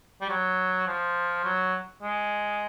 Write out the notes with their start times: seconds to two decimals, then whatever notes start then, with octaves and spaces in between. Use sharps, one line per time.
0.21 G3
0.29 F#3
0.87 F3
1.44 F#3
2.02 G#3